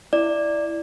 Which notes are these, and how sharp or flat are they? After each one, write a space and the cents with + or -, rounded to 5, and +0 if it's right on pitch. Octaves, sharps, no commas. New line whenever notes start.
E4 +0 D5 +5